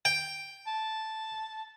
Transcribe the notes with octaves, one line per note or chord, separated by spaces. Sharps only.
G5
A5